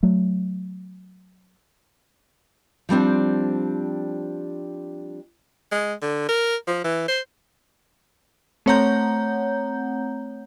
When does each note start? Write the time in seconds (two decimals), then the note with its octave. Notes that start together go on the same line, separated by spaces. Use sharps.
0.03 F#3 A3
2.89 F3 G3 C4 D4
5.72 G#3
6.02 D3
6.29 A#4
6.67 F3
6.84 E3
7.08 C5
8.66 A3 C4 C#5 F#5 A#5 G6